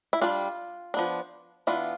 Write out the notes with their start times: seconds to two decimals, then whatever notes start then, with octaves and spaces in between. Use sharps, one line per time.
0.13 E4
0.21 G3 D4 F4
0.94 F3 B3 D4
1.67 E3 B3 D4 F4